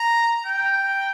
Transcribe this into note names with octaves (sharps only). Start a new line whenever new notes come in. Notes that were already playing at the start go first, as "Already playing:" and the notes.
Already playing: A#5
G5